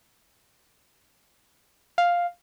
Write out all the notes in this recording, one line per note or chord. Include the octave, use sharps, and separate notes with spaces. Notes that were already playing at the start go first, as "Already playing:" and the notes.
F5